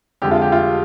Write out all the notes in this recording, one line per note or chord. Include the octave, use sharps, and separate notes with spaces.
F2 D3 G#3 G4
F4
G4
F4